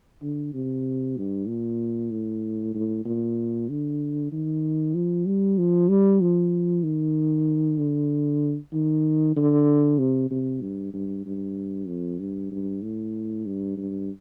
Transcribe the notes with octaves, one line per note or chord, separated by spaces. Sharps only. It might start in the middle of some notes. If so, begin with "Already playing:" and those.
D3
C3
G2
A#2
A2
A2
A#2
D3
D#3
F3
G3
F3
G3
F3
D#3
D3
D#3
D3
C3
C3
G2
G2
G2
F2
G2
G2
A2
G2
G2